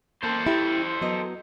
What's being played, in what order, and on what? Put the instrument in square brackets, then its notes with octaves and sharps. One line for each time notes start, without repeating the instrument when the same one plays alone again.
[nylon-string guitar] A#3 [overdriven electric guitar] A4 C5
[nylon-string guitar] E4 G4
F#3 B3 D#5